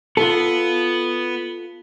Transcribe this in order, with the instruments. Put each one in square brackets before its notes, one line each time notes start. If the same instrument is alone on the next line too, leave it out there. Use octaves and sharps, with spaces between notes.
[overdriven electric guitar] B3 [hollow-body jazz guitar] F4 A4